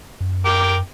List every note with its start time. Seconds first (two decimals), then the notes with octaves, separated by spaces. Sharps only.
0.20 F#2
0.46 A#4 G5 D6